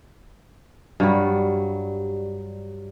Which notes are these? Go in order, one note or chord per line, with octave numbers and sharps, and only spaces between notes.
G2 F#3 G3